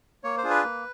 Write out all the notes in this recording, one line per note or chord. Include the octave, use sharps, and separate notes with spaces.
A#3 C#5
C5
D4 F4 G#4
B4
A#3